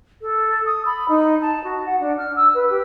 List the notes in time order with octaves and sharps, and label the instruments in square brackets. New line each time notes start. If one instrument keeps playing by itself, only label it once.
[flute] A4
D#6
B5
D#4
A5
F#4
F#5
D4
F6
E6
B4
G4